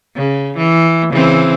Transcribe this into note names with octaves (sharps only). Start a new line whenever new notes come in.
C#3
E3
C#3 E3 C4